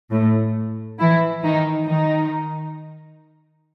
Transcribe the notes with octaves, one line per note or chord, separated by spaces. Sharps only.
A2 A3
E3 E4
D#3 D#4
D#3 D#4